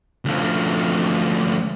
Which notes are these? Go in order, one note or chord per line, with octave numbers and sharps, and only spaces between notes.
D2 F3